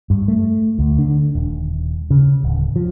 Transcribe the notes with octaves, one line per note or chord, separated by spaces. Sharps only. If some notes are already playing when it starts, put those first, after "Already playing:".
G2
A3
D2
D3
D#1
C#3
D1
F3